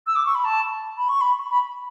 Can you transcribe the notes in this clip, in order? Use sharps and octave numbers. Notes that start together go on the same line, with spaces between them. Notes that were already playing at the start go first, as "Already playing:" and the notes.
E6
D6
C#6
B5
A5
B5
C#6
B5
B5